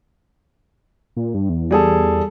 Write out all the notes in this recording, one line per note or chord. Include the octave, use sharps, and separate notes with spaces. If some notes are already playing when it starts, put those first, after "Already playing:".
A#2
G2
E2
G3 G#4 A4